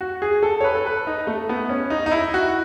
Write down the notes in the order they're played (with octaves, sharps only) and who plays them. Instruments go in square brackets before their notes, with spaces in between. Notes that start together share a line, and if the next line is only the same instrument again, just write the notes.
[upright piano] F#4
G#4
A4
C#5
B4
A4
B4
D#4
A3
B3
C#4
D#4
D#4
E4
F#4